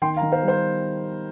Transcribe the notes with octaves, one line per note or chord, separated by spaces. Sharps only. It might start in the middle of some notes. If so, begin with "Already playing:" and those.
D#3 G5 C6
F5 A#5
D#3
C5 F5
G3
C5